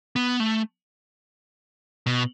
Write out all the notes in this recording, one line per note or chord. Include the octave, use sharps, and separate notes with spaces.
B3
A3
B2